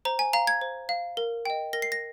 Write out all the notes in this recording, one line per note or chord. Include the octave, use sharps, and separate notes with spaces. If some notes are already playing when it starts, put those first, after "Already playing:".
C5 A#5
G#5
F5 A#5
G#6
C5
F5
A#4
D#5 G5
A#4 A#6
C7
A#6